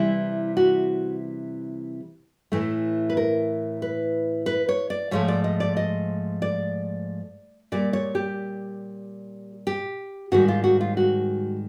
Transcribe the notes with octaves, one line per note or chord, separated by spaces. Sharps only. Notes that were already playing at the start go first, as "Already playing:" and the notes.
Already playing: C3 E3 G3 E4
F#4
A2 E3 A3
B4
A#4
B4
B4
C#5
D5
G#2 F3 A3 C#5
D5
D#5
D5
D#5
D5
A#2 G3 D5
C#5
G4
G4
G#2 D#3 G3 F#4
F4
F#4
F4
F#4